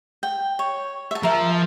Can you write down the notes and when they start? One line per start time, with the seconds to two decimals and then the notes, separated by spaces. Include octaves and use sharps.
0.23 G5
0.59 C#5
1.11 E5 A5
1.23 F3 A#4 E5